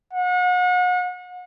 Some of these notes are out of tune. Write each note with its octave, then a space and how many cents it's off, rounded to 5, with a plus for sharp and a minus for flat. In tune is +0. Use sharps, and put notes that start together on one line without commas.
F#5 -35